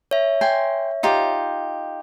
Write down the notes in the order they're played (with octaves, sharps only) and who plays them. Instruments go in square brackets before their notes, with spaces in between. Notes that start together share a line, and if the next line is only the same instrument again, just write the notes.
[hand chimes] C#5 E5
[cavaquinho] G5 G#5 C6
D#4 F4 G4